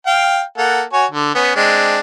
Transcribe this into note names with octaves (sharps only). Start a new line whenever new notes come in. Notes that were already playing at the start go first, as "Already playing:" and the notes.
F5 G5
A#3 A4 F#5
F#4 C#5 G#5
D3
B3 C#4
G#3 C4 D4